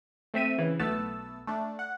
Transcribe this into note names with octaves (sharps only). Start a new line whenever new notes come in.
A3 C4 E5 D#7
C#3 E3
B1 A3 B3 A5 E6
A3 D4
F#5